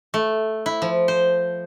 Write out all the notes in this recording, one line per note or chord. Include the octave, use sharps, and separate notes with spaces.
A3
E4
F3
C5